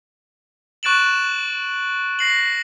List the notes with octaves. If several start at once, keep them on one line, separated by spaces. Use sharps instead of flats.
C#6 F#6 A6 D7 E7 F#7
A#6 C7 F#7